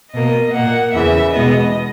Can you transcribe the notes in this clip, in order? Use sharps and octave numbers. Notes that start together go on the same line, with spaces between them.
B2 A#3 D#5
A#2 A#3 F#5
E2 C#3 E3 E5
B2 G#3 B3 D#5